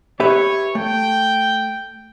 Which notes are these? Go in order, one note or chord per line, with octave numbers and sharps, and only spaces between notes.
G4 B4 C#5 E5
A3 G5